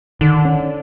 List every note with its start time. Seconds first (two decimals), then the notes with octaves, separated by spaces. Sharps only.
0.21 D3 D#3
0.45 C#4